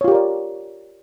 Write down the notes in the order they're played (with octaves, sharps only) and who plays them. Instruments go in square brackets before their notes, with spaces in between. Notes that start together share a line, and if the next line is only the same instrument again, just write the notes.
[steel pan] C#5
F4
G4
A#4
D5